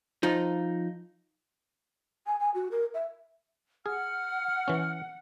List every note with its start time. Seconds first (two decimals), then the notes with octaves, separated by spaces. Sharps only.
0.23 F3 D#4
2.27 G#5
2.40 G#5
2.54 F#4
2.71 A#4
2.94 E5
3.86 G#4 F#5 F6
4.68 E3 C#4